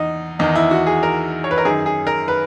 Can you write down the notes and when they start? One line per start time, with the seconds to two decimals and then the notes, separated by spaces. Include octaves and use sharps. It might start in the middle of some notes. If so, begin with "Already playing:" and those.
Already playing: E2 D#4
0.39 E2 D#3 D#4
0.55 E4
0.71 F#4
0.86 G#4
1.03 A#4
1.44 C#5
1.51 B4
1.58 A#4
1.65 F#2 D#3 G#4
1.86 G#4
2.07 A#4
2.28 B4